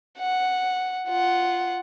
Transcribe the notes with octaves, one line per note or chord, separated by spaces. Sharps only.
F#5
F4 F#5